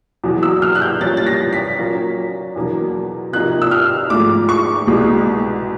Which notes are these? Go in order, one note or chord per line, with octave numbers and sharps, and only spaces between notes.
E2 B2 F#3
E6
F6
F#6
G6
A#2 G3 A#3 C#4 A6
A6
A#6
B6
A#2 F#3 A#3 C#4
E2 B2 F#3 A#3 D4
C3 F3 A#3 D#4 F#6
E6
F6
G#2 F3 A3 D6
C#6
C2 B2 G#3